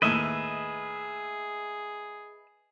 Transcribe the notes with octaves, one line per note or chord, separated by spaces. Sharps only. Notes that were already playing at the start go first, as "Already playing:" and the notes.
D#2 A2 G#4 B4 D#5 E5